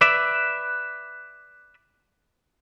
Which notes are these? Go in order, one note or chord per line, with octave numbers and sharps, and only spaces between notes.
B4 D5 E5